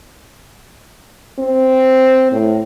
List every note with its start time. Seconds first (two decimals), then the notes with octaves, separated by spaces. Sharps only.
1.39 C4
2.32 A2